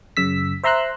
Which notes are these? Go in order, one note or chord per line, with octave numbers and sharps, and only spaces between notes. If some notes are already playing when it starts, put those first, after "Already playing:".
F#2 C#3 E6 B6
C5 E5 A#5 C6 E6 F#6